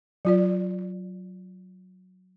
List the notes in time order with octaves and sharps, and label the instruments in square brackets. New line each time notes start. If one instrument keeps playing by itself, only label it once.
[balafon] F#3 F4 D5